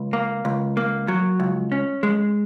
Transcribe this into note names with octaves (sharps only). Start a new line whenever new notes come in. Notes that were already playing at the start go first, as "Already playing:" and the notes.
Already playing: C#2
A#3
C#2
A#3
F#3
C#2
C#4
G#3